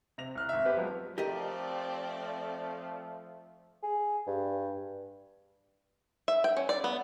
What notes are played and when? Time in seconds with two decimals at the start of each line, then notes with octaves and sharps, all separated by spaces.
0.18 C3 C4 A#6 F7
0.35 C2 F6 F#6
0.49 G#1 E5
0.65 B3 G4 B4 C5
0.77 F3 F#3 G#3 A#3 B3
1.18 F3 A3 C4 G4 A#4 D5 D#5
3.83 G#4
4.27 G2
6.28 E5
6.44 G5
6.57 C#4
6.69 D5
6.84 B3